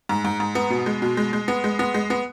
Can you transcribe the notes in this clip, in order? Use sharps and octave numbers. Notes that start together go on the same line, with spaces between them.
G#2
G#2
G#2
B3
B2
G#3
B2
G#3
G#3
B3
G#3
B3
G#3
B3